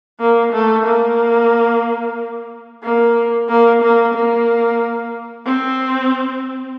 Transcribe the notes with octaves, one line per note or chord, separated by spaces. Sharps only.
A#3
A3
A#3
A#3
A#3
A#3
A#3
C4